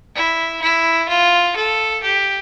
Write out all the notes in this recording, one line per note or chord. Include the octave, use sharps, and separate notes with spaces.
E4
E4
F4
A4
G4